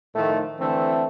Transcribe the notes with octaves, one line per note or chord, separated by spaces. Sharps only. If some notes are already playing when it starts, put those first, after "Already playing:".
A2 D#3 F3 A3
D3 E3 A3 C4